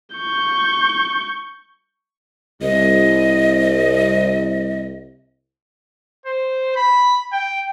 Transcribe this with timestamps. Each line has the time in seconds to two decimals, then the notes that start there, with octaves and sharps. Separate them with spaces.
0.16 C#6 G6
2.62 C2 D#5
6.26 C5
6.76 B5
7.33 G5